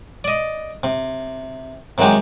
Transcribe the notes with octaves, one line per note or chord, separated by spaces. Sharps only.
D5 D#5
C3
C3 D#3 F#3 G#3 G4